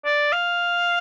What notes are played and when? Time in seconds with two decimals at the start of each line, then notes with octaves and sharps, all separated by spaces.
0.05 D5
0.32 F5